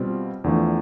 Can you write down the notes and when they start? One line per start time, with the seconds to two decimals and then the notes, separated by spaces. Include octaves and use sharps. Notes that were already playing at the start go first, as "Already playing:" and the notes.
Already playing: B2 G3 C4 F4
0.44 E2 D3 F3 A3